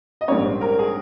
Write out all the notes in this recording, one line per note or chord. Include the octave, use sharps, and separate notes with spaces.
D#5
A#1 G#2 G3 A#3 C#4 C#5
C5
A#4
G#4